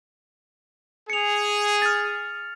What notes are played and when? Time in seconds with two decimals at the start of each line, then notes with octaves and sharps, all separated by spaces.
1.10 G#4 C#7 F7
1.82 F6 A6